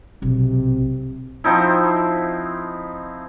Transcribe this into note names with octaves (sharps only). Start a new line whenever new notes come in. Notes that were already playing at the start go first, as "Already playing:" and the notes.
B1 C3
F3 C4 D#4 E4